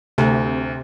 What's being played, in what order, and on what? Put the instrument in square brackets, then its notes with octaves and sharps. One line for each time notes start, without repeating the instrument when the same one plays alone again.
[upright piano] D2 [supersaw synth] C3